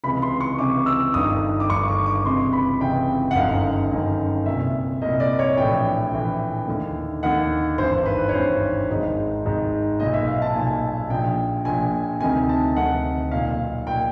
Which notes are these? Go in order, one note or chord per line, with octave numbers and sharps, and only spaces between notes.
C#2 C3 E3 B5
C6
C#6
C#2 C3 E3 D6
E6
G1 G2 D#3 D#6
D6
G1 G2 D#3 C#6
D6
D6
C#2 C3 E3 C6
B5
C#2 C3 E3 G5
F#5
G1 F#2 D#3 F5
G1 F#2 D#3
C2 A#2 E5
C2 A#2 D#5
D5
C#5
A#1 A2 E3 G5
A#1 A2 E3
D#2 D3
D#2 D3 F#5
G#1 G2 E3 C5
B4
C#5
G#1 G2 E3 C5
G#1 G#2 D#3
G#1 G#2 D#3
B1 A#2 D#5
E5
F5
A5
B1 A#2 G#5
A#1 A#2 G5
A#1 A#2 G#5
D2 C3 D#3 G#5
A5
D2 C3 D#3 F#5
B1 A#2 F5
A#2 G5